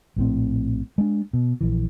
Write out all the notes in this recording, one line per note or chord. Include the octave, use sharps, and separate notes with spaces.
A#1 A2 C4
G#3 D4
B2
A#1 E3